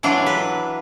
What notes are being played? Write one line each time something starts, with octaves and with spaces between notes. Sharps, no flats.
E3 F#3 D4 F4
B4